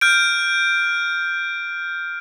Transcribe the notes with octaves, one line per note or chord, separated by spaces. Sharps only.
F6 G6 D7